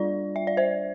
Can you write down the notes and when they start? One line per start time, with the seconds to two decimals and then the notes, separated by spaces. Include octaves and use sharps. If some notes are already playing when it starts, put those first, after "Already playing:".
Already playing: G3 D4 F4 D5
0.36 E5
0.47 D5
0.57 C5 E5